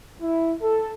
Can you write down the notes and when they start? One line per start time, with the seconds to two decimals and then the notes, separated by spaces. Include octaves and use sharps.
0.21 E4
0.62 A4